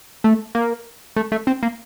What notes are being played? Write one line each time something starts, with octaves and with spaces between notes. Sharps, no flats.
A3
A#3
A3
A3
C4
A#3